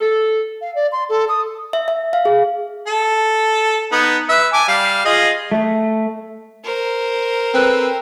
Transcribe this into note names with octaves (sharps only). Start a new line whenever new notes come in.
A4
F5
D5
C6
A4
D#6
E5
E5
F5
G#4
A4
B3 D#4
B4 E5
G#5 A5 D6
G3 F5
F4 G#4 D#5
A3
A#4 C5
C4 A4 B4